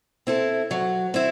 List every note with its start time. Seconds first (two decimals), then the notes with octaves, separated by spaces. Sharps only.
0.27 C4 E4 A4
0.71 F#3
1.14 C4 E4